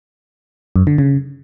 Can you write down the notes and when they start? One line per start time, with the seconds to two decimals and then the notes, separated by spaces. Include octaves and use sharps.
0.76 F#2
0.87 D3
0.98 C#3